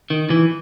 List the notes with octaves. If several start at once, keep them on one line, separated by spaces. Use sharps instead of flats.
D#3
E3